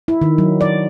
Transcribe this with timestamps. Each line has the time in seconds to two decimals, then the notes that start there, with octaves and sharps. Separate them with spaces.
0.08 E4
0.21 D#3
0.38 F#3
0.61 D5